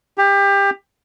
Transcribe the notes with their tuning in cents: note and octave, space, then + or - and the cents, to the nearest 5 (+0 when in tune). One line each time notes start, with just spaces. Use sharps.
G4 +25